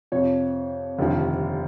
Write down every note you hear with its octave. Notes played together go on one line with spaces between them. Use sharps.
F2 C3 F3 C#5
F1 D#2 D3 F3